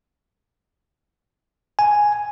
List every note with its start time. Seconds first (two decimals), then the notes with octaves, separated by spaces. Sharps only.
1.79 G#5